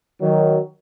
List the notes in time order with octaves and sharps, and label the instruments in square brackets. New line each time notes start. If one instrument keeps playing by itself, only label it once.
[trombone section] D#3 F#3